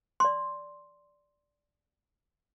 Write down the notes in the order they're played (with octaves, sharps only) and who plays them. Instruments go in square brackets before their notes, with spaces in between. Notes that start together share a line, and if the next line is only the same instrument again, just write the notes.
[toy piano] D5 C6